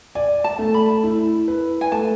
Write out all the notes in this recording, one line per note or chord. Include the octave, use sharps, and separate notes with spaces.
D5 G#5
A5
A3
B5
E4
B4
G#5
A3 A5